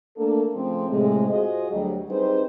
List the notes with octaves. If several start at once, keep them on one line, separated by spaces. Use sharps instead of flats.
A3 A#3 D4 A4
C#3 F3 A3 C4
A2 C3 G#3
F4 F#4 G#4 C5 D#5
D2 F#3 G3
G3 C4 D#4 G#4 B4 C5